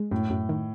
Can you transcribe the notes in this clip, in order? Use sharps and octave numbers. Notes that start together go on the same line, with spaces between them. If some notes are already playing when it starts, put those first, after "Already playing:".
Already playing: G#3
F#2 A2
F#2
D#3